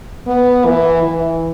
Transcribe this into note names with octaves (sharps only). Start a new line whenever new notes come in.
B3
E3
E3